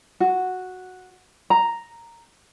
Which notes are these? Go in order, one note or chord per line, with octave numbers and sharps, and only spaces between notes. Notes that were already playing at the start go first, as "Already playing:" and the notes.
F#4
A#5